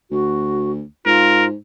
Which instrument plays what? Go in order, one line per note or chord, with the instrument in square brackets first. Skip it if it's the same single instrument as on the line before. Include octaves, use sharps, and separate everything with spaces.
[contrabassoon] D2 [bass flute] F#4
[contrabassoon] G#2 [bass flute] F4 [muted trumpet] A#4